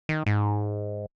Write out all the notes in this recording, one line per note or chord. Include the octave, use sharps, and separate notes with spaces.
D#3
G#2